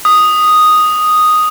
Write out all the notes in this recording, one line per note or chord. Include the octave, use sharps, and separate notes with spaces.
D#6